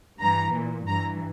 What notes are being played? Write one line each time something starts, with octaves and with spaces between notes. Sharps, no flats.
G2 E3 A#5
A#2
G2 E3 A#5